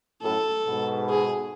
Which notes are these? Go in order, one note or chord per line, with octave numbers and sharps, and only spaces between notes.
F#2 A2 A4
G#2 B2
G#4